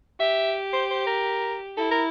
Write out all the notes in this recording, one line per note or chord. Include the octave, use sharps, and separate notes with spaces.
G4 E5
C5
C5
A#4
E4 A4
A#4